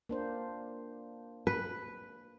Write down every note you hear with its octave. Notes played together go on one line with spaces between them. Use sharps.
A#3 D4 C5
B4